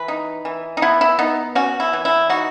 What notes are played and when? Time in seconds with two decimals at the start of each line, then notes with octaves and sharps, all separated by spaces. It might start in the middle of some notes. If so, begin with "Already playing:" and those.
Already playing: E3 B4
0.08 D#4
0.45 E3
0.77 D#4
0.82 B3 E4
1.01 E4
1.19 B3 D#4
1.55 C#4 F#4
1.80 E4
1.93 E3
2.05 E4
2.29 D#4 F#4